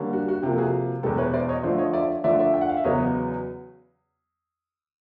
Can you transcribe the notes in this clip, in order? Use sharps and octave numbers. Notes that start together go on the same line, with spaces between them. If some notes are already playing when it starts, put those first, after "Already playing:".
Already playing: D3 G3 A#3 C#4
F#4
F#4
C3 F3 A#3 G4
A4
F#4 G#4
E2 B2 G#3 B3 G4 A4
B4 C#5
C5 D5
C#5 D#5
D3 F3 A3 C5 D5
C#5 D#5
D5 E5
D3 F3 A3 D5 E5
D5 E5
G5
F#5
F5
E5
E2 C#3 F#3 B3 C#5 D#5